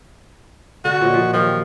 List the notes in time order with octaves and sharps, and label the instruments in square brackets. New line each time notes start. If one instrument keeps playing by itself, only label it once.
[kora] D3 [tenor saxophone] F#4
[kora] A#2 C#5 D#5
F3
[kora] D#3 F#3 G4 [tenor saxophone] F3